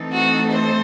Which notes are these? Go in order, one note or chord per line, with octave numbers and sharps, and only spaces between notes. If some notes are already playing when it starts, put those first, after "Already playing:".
Already playing: E3 A3 C4 D#4 A4
F#4
C5